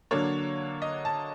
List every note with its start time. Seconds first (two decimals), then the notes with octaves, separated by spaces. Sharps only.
0.11 D3 F#3 A#3 D4 C#5
0.82 D#5
1.05 A5